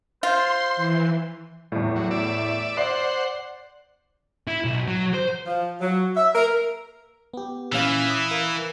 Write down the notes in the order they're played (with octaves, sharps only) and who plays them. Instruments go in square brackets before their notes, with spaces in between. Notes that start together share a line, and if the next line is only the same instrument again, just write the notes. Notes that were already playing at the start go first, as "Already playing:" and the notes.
[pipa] F4 [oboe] C5 [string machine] C6
[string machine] E3
[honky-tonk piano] E2 A2
[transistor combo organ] F#3
D5 E5
[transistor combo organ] C5 F#5 [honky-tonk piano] D5 C7
[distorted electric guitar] E4
B1
F#3
C5
[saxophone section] F3
F#3
E5
A#4
[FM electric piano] B3 G4
[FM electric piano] A#2 C#4 F5 [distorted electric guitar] E3
[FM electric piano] D#6
A#4 F5